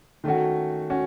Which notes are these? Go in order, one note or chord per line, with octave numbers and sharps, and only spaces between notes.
D#3 A3 C#4 F#4
C#4 F#4